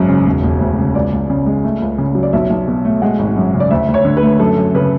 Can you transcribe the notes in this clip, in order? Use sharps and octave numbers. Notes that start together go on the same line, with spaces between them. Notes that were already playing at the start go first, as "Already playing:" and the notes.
Already playing: G#1 F#2 G#3
C#3
E1
E1
D2
C#3
C#2 D5
C#2
C#3
G#3
A3
C#2
C#3
F#3
D5
B1 E5
B1
B2
A3
G#3 F#5
G#1
F#2
C#3
D5
D2 E5
D2
C#5
D3
B4
A3
F#2 A4
F#2
C#3 B4